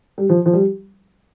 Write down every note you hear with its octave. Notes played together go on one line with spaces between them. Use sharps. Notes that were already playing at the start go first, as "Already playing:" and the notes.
G3
F3
F3
G3